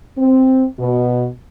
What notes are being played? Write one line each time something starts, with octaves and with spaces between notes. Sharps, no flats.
C4
B2